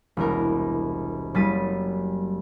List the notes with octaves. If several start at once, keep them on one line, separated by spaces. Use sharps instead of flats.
E1 C2 A#4
F#1 G3 A6 B6 D#7